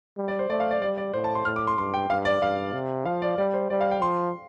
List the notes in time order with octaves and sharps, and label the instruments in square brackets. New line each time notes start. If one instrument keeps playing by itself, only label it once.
[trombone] G3
[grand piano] D5
C5
[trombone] A3 [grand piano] D5
[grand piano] F5
D5
[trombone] G3 [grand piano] D5
[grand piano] D5
[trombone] A2 [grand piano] C5
[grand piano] A5
C6
[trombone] A2 [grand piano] F6
[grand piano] D6
C6
[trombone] G2 [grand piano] C6
[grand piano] G5
[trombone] G2 [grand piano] F5
[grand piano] D5
[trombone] G2 [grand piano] F5
[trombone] C3
[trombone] F3 [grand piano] F5
[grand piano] D5
[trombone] G3 [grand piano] D5
[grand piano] C5
[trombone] G3 [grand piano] D5
[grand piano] F5
G5
[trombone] F3 [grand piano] C6